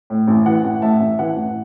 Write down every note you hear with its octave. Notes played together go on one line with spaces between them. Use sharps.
A2
A1
E3 F#5
A1 F#5
A2 E5 A5
A1 E5
E3 F#5
A1